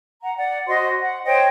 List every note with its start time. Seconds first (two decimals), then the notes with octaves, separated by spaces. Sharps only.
0.23 F#5 A#5
0.37 D5 F#5
0.68 F#4 C5 D#5 C6
1.00 F#5
1.25 C5 C#5 D#5 G5